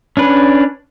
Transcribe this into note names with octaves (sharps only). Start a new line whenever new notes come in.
C#4 D4 B4